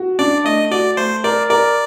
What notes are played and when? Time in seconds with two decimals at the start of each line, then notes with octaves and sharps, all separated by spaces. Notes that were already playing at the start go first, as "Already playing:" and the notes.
Already playing: F#4
0.19 D4 D5
0.44 A3 D#5
0.71 F#4 D5
0.97 A3 C5
1.24 A#4 D5
1.50 A#4 D5